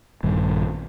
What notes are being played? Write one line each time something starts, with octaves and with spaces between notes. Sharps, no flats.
A#1 G2 D#3